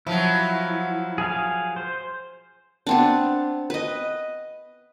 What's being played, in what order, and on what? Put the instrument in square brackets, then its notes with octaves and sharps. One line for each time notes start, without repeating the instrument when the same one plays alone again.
[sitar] F3 F#3 [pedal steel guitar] E4
[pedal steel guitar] G#4 F5
C5
[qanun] B3 C4 D4
B4 D#5